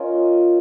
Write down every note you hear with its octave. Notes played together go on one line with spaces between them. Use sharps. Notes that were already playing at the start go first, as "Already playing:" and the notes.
Already playing: C#4 F4 A#4 D#5